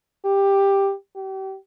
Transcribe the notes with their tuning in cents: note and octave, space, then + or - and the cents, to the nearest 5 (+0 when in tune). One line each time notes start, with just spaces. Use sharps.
G4 +10
G4 -35